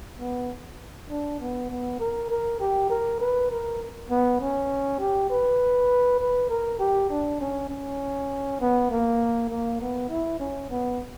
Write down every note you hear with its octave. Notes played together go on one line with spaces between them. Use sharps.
B3
D4
B3
B3
A#4
A#4
G4
A#4
B4
A#4
B3
C#4
G4
B4
B4
A#4
G4
D4
C#4
C#4
B3
A#3
A#3
B3
E4
C#4
B3